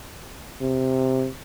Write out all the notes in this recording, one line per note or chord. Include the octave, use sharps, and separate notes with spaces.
C3